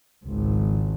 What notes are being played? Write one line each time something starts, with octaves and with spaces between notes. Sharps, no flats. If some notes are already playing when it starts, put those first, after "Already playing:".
G#1 C#2